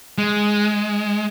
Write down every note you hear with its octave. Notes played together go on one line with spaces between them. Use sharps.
G#3